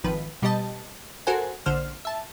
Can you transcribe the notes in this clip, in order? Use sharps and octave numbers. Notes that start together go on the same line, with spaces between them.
G#1 D#3 F3 B4
B2 G3 G4 D#5 A5
F#4 A4 A#4 C5 F#5 G#5
A#1 D3 C5 F6
E5 A5